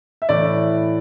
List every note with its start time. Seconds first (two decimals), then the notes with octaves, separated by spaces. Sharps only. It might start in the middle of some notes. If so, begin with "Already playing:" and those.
0.22 E5
0.29 A2 E3 D5